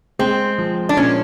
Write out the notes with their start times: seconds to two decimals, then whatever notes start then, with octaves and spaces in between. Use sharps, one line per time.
0.19 G#3 C4
0.58 F3
0.89 D4
0.97 A#2 C#4